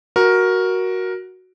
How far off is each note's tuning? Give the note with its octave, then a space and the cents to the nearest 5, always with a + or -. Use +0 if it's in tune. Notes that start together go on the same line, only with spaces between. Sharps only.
F#4 +0 A#4 +10